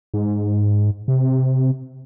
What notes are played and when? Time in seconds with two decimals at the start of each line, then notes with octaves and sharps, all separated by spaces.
0.14 G#2
1.08 C3